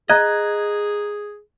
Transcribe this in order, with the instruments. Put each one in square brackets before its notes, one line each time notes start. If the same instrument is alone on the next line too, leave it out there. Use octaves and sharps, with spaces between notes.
[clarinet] G#4 [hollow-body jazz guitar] D#5 [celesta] A#5 F#6 G#6